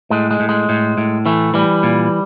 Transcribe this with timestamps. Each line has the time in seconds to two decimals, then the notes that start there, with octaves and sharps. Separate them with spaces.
0.10 A2 G#3
0.31 G#3
0.40 A2
0.49 G#3
0.69 A2
0.98 A2
1.26 E3 A3
1.54 E3 G3
1.83 A#2